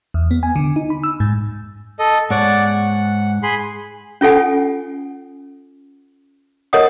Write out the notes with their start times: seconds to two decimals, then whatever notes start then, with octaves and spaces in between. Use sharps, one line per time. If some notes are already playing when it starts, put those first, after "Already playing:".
0.14 E2
0.31 B3
0.43 G#5
0.56 D3
0.76 D#4
0.90 B5
1.03 E6
1.20 G#2
1.99 A4 D#5
2.30 G#2 C#5 D5 F#5
2.66 F#5
3.43 G#4 B5 C6
4.21 C#4 F4 A4 F#5 G#5
6.73 A#4 C#5 D#5 F#5 D#6